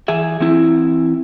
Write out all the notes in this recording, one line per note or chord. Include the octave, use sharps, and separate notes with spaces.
E3 G#4 E5
E3 C4 E4